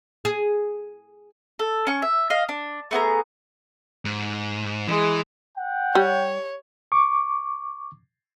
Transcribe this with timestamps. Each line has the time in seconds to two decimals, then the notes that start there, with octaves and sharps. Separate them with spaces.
0.25 G#4
1.59 A4
1.87 C#4 C#6
2.02 E5
2.30 D#5 F5
2.49 D4
2.91 A3 B3 G#4 A#5
4.05 G#2
4.88 E3 G#3
5.56 F#5 G5
5.95 G3 C#5
6.92 C#6 D6